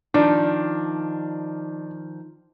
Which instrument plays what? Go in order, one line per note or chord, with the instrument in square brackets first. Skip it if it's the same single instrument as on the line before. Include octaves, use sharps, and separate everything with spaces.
[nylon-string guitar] D#3 F3 D#4 [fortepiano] D4